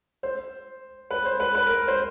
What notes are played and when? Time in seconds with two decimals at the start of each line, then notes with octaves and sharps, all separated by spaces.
0.23 C5
1.10 B4
1.25 C5
1.40 B4
1.55 B4
1.66 A#4
1.88 C5